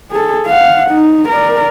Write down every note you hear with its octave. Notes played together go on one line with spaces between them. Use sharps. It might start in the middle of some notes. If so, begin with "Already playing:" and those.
G#4 A4
F5 F#5
D#4
A#4 D5